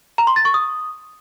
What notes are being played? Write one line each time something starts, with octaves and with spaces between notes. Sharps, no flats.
A#5
C6
A6
C#6
D#6